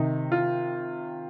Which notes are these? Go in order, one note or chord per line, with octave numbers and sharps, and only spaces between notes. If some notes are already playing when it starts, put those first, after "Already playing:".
Already playing: C3 D#3 D#4
F4